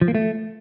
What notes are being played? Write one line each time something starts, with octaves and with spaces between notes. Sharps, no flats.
F3
A#3
A3